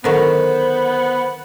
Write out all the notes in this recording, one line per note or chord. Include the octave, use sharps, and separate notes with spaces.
D3 D#3 F#3 B3 C5